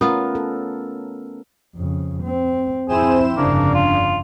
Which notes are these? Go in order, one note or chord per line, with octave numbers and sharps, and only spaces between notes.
A3 B3 C#4 F4 A#4
A4
F2 C#3
C4
F2 C4 E4 G#4 C5 E7
G1 F2 C#3 A#3 D4
F4